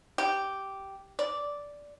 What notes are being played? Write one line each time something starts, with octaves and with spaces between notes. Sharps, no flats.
G4
D5